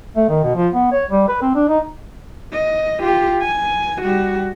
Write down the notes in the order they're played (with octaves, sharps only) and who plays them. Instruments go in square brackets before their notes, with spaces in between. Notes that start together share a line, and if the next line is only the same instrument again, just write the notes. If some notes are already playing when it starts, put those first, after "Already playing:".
[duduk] A3
D#3
B2
F3
B3
C#5
G3
B4
C4
D4
D#4
[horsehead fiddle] D#5
F4 G4
G#5
G3 F#4